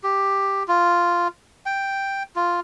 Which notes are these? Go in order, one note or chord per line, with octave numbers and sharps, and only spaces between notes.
G4
F4
G5
F4